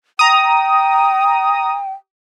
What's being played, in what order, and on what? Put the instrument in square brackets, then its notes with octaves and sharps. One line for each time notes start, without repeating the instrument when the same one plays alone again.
[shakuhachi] G5 [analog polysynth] A#5 D#6